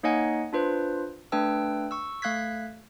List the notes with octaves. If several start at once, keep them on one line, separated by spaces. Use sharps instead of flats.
A#3 D#4 C#5 D#5 F#5 G#5
D4 F4 B4 C5
A3 D4 B4 G5 E6
C#6 E6
A3 F5 F#6 G#6 B6